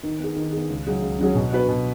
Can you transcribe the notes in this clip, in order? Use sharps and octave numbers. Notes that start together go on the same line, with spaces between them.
D#3
B3 G#4
D#3
B3 G#4
C#2
C#3 F#3 C#4 G#4
C#2
C#3 F#3 C#4 G#4
B2
B3 F#4 B4
B2